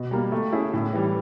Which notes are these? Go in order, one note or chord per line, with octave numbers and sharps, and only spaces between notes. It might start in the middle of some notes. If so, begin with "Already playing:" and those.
Already playing: B2
G3 A#3
A3
C#4 E4 G#4
A2
E3 G3